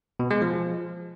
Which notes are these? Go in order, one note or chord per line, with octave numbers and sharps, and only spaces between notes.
B2
G#3
F3